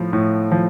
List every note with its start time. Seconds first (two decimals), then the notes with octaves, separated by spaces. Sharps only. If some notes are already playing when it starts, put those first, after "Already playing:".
Already playing: A2 F3
0.13 A2
0.52 F3